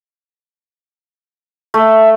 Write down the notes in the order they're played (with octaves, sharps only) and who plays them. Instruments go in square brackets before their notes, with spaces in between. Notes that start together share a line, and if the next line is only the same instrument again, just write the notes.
[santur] A3 [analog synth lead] E5